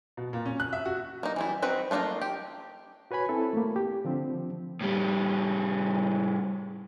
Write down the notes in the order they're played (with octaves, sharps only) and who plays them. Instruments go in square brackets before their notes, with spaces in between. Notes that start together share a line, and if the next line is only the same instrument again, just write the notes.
[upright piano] B2
A#2
C#4
F#6
E5
F#4
[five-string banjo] A#3 D#4
E3 G3 E4
C4 D#4 F#4 B4
A3 A#3 D4 D#4 F4
G4
[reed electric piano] F#4 B4 C#5 G#5 B5
C4 E4 A4
A3 A#3
G4
D3 F3 C4
[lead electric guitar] A2 G3